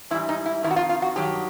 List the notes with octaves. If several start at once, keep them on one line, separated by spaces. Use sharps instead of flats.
G#2 E3 G3 E4
D#4
E4
F2 C3 D#3 E4
F#4
F4
F4
F#4
G2 D#3 F#3 G4